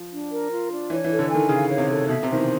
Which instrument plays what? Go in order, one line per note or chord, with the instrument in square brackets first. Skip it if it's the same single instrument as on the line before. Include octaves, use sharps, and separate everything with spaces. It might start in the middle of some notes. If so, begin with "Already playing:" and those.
Already playing: [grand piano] F3
[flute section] D4
A#4
F4
D4
[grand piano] E3 [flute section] C#5
[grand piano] E3
[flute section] A4
[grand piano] D3
[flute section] G#5
[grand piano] D#3
[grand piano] C#3 [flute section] F5
[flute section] C#5
[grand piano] C3
[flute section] A4
[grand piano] B2 [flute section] E5
[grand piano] C3
[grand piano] D#3 [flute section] C5
[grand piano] E3